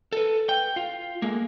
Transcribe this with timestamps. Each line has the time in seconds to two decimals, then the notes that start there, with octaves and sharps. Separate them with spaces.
0.12 A4 B4
0.49 G5
0.76 F4
1.22 G#3 A#3